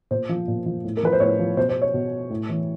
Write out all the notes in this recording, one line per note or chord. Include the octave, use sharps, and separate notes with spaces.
A#2 C5
F3
A#2
F3
A2
A#4
F3 B4
C5
A2 C#5
F3
B2 C5
C5
C#5
B2
A2
E3